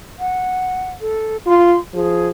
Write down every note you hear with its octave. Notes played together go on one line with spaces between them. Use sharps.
F#5
A4
F4 C6
F3 G#4